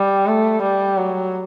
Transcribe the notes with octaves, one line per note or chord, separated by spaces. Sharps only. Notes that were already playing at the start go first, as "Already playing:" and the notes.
Already playing: G3
A3
G3
F#3